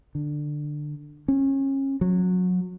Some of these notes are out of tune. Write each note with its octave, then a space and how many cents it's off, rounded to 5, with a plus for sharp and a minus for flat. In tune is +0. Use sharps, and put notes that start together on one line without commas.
D3 +15
C#4 -30
F#3 -25